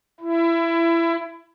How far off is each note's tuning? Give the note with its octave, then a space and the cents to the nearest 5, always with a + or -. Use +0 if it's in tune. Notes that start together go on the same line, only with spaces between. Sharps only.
E4 +20